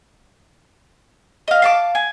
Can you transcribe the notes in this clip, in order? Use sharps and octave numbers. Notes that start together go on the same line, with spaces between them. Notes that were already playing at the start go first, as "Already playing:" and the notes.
D#5 F5
F5 A5 D6
G#5